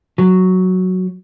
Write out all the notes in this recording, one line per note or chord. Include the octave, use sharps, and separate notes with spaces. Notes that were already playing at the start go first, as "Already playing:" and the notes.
F#3